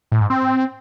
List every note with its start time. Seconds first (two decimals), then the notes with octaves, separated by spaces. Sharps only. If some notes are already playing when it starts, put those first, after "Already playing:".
0.12 A2
0.21 G#2
0.30 C4